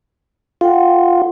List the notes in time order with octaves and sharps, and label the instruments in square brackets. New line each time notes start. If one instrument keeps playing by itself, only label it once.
[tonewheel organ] F4 [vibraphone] A4 F#5 G5